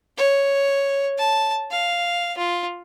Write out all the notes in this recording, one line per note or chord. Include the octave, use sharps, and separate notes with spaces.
C#5
A5
F5
F4